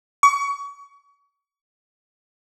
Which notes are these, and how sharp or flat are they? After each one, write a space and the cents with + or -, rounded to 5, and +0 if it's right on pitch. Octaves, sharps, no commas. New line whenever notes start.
C#6 +35